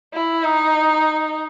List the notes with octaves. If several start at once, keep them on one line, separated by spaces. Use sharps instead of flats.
E4
D#4